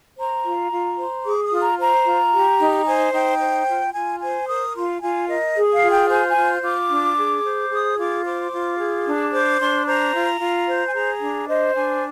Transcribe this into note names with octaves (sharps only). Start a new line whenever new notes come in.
C5 A#5
F4
F4
C5
G#4 D6
D#6
F4
A#5
C5 A#5
F4
G4
D#4
C5 G#5
D#4 G5
C5
F4
F4 G#5
C5 G#5
A#4 D#6
F4 C6
F4 G#5
A#4 D#5
G#4
F5
F4
G5
C5 G#5
G#5
F4
F4 D6
D4
G#4
C5
G#4 D#6
F4 D6
C5 D6
F4
G#4
D4
C5 D6
D4 C6
C5 A#5
F4
F4
C5
G#5
G#4 A#5
D4
C5 D#5
D4 G#5